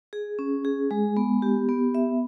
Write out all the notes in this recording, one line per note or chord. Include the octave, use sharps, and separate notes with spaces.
G#4
C#4
G#4
G#3
B3
G4
B3
E5